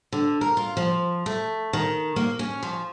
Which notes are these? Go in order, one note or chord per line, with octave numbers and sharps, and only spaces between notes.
D3
A#4
F4
F3
A3
D#3
A#3
C#4
F3